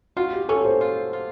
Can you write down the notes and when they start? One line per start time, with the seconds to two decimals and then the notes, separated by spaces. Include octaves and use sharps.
0.16 F4 F#4
0.33 G4
0.49 C#4 A4
0.65 C5
0.81 F4
1.13 F4